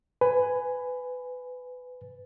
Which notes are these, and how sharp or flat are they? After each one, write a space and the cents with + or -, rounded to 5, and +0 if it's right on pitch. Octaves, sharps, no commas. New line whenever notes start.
B4 +20 G#5 +0